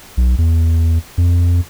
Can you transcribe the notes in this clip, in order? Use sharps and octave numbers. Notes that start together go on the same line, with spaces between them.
B1
E2
F2